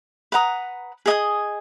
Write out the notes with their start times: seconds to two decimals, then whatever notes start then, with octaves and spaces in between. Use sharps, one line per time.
0.32 B4 F#5 A#5 D#6
1.06 G#4 D#5 G#5 D#6